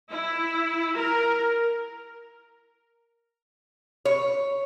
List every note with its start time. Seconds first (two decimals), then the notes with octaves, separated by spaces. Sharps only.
0.12 E4
0.98 A#4
4.05 C#5